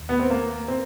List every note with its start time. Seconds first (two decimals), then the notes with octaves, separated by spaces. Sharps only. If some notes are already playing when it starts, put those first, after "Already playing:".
Already playing: D#2
0.09 B3
0.19 C4
0.30 A#3
0.68 C4